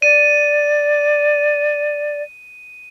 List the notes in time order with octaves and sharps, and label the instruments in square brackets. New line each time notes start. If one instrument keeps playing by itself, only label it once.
[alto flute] D5 [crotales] D#7